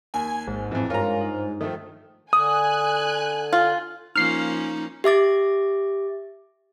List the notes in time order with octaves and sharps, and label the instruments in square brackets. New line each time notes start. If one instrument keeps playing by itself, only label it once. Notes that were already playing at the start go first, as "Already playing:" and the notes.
[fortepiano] D#2 [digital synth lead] G#5
[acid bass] G#1 [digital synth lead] G#2
[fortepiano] F2 E3 [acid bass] A2
[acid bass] G2 [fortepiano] F4 A#5 [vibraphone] A#4 C#5 F5
[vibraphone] D#4
[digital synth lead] D#3 [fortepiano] F3 A3
[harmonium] D3 [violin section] G#5 F#6 [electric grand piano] D#6
[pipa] F4
[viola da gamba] F3 A#3 C#4 [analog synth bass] D#4 [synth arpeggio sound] F6 C7
[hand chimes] G4 E5 D6 A6